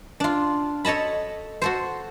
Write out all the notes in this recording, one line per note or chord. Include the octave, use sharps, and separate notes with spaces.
D4 F4
A4 C#5 D#5 A5 B5
F#4 A4 C5